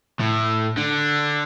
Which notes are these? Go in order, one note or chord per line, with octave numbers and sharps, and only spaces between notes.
A2
D3